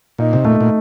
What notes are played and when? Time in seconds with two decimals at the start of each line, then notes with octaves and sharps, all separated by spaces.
0.18 A#2 D#4
0.33 C3
0.45 A#2 A3
0.61 A#2